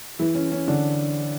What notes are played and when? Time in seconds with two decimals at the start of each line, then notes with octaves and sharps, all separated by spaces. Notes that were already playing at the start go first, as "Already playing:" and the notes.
0.19 E3 E4
0.35 C#4
0.52 C#4
0.68 D3 D4